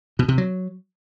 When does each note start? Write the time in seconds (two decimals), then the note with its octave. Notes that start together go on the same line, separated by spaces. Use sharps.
0.19 B2
0.28 C3
0.38 F#3